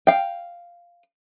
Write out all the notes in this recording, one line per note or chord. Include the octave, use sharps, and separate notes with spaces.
F5 G5